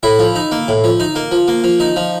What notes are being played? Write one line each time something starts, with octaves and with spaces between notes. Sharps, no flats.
A2 E4
F3
D#4
A#3
A2
F3
D#4
A#3
F3
A#3
F3
D#4
F3